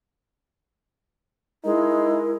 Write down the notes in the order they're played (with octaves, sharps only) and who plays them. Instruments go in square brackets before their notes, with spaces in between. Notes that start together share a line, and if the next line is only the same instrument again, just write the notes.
[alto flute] G#3 [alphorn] D#4 [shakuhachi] E4 [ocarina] A#4